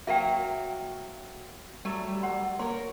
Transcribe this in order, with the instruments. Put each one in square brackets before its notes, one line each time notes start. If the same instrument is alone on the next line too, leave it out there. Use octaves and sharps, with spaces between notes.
[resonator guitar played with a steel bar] F#3 A#3 F#4 [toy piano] E5 F5 G5
[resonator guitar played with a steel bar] F#3 A3 [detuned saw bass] G3
[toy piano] F#5 C6
[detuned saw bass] A#3 [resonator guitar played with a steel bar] A#4 C#5 [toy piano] C6